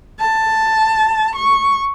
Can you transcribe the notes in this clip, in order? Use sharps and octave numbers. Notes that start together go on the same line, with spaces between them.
A5
C#6